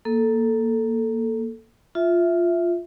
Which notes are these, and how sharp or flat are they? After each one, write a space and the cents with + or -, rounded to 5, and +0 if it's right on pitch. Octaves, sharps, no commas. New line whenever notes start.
A#3 +0 A4 +0
F4 +0 E5 +0